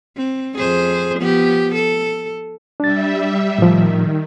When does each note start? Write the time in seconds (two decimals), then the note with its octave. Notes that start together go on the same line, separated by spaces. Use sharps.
0.17 C4
0.58 F2 G#4 C5
1.18 F3 B3 G4
1.75 A4
2.80 G3 D4 E5 A6
3.58 A2 D#3 F3